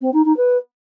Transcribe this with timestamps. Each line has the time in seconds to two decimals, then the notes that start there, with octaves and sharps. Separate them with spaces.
0.01 C4
0.13 D#4
0.25 D#4
0.37 B4